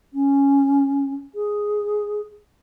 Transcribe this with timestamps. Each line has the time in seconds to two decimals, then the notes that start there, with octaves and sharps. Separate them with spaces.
0.13 C#4
1.35 G#4